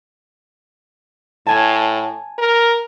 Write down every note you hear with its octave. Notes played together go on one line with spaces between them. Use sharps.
A2 G#5 A5
A#4